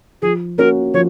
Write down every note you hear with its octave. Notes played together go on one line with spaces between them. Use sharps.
F3 G#4
A#3 C#4 F#4 A#4
F3 C#5